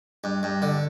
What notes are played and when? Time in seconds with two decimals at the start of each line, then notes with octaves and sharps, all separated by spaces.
0.24 G2
0.43 G2
0.62 D3